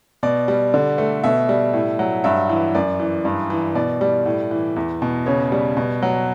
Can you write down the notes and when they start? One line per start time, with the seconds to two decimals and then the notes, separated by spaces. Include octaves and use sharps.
0.23 B2 D5
0.48 G3
0.74 D3
0.98 A3
1.24 B2 E5
1.49 G3
1.73 A2
1.99 F#3
2.24 G2 E5
2.49 E3
2.75 F#2 D5
3.00 E3
3.25 G2
3.50 E3
3.75 B2 D5
4.01 G3
4.26 A2
4.51 E3
4.76 E2
5.02 B2
5.26 C#3 C#5
5.52 G3
5.77 B2
6.02 F#3